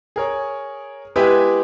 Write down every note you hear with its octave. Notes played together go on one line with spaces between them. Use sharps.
G#4 A#4 C#5
G#3 B3 E4 G4 G#4 B4